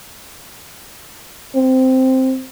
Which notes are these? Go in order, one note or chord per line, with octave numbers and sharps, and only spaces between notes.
C4